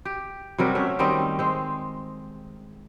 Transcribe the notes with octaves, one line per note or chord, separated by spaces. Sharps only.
G4
C3 F#3 G3 A#4
A3 C#4 E5
D#3 G3 C4 D#5
G#3 C4